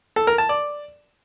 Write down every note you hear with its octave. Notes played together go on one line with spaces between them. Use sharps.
A4
A#4
A5
D5